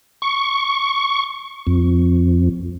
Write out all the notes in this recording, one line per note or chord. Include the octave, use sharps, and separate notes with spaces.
C#6
F2